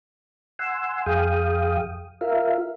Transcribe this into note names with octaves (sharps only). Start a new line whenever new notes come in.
F#5 G#5 C6 E6
F2 G#4 F5 G5 D#6
F4 A#4 E5 F5